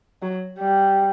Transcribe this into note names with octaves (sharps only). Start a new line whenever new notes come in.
F#3
G3